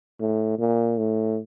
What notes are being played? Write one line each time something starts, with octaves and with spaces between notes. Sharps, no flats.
A2
A#2
A2